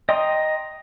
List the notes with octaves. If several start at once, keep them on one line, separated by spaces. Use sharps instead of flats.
D#5 G5 A#5 C6 D#6